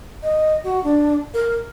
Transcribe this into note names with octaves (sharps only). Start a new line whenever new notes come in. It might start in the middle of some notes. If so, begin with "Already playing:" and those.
D#5
F#4
D4
A#4